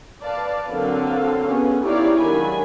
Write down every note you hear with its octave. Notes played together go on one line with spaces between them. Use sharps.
B4 D5 F5 A5
D3 F#3 A#3 C4 A4 F5
B3 C#4 G#4
D#4 E4 G4 C#5 D5 F5
D#3 F#3 G#3 D4 G#5 B5